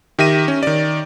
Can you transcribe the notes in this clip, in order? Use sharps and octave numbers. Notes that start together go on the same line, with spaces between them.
D#3 G4 E5 A#6 D#7
C#4
D#3 D5